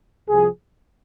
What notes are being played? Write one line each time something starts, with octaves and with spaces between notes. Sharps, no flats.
C2 C3 F3 G#4